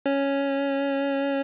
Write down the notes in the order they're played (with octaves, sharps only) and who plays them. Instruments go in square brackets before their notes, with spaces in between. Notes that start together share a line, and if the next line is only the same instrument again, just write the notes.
[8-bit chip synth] C#4